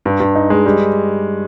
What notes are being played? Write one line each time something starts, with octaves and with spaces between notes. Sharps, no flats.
G2
G2
D#4
G#3
G3